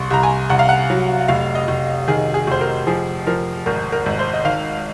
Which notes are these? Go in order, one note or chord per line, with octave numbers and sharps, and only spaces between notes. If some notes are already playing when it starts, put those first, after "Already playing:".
Already playing: C2 C6 C#6
C2 A#5
G#5
C2 F#5
F5
F#5
F#3
F1 F5
D#5
F1
D#3 G#4
G#4
F1 C5
A#4
F3 G#4
F3 A#4
G#1 A#4
A#4
G#1
C5
D#5
D#3 F5